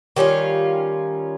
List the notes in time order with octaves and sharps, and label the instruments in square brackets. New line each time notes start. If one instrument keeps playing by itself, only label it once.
[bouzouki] D#3 G3 C#4 F4